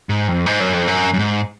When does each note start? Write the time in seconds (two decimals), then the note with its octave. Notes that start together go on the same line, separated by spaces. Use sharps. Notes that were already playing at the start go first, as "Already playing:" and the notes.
0.09 G#2
0.28 F2
0.46 G#2
0.60 F#2
0.74 F2
0.88 F#2
1.14 F#2
1.19 G#2